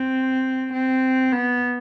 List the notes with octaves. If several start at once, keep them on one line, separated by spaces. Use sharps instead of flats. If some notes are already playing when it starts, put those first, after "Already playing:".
Already playing: C4
C4
B3